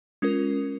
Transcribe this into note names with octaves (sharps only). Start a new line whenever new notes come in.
G#3 C#4 F4 A#4